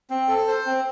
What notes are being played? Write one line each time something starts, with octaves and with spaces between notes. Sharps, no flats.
C4
A4
C5
C4